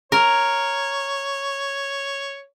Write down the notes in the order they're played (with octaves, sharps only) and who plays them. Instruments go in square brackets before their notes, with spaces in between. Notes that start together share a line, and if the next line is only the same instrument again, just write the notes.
[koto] A#4 [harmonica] C#5